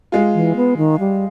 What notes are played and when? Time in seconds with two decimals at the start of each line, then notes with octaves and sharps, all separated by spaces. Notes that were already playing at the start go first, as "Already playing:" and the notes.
0.12 G#3 F4
0.34 E3
0.56 B3
0.77 D#3
0.99 G3